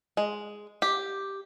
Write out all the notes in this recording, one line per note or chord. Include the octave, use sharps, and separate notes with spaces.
G#3
G4